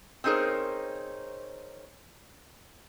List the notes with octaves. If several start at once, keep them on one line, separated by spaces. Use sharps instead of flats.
C4 C#4 D#4 G#4 A#4 C5